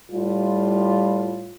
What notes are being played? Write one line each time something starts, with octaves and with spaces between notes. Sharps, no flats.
A2 G3 F4